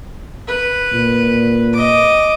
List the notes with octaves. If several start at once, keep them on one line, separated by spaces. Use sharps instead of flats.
B4
A#2
D#5 D6